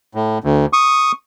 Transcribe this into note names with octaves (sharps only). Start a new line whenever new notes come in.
A2
D2
C#6 D#6